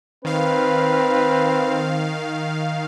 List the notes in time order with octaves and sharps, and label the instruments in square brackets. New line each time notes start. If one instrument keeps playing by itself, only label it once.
[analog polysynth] D#3 F5 [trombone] C4 [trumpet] B4